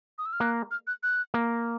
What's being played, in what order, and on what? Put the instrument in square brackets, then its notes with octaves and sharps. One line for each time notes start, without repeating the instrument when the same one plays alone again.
[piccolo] D#6
E6
F6
[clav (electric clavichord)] A#3 [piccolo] F#6
[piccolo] F6
F#6
F#6
[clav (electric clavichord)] A#3